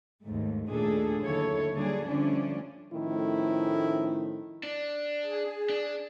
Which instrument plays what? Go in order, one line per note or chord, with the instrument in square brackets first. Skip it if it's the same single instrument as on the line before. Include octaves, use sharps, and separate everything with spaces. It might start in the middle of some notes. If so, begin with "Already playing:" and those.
[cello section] D#2 G#2 A3
D#2 A#2 A3 D4 G#4 A4
D#2 D3 F#3 E4 A4 C#5
D3 F#3 G3 A#3 D4 G#4
D3 F3 G3 A3 C#4 D4
[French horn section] A2 D#3 F3 A3 C#4 E4
[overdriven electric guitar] D4
[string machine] G#4
[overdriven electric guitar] D4